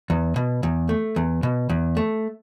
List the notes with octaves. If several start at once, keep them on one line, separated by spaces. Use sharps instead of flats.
E2
B2
E2
A3
E2
B2
E2
A3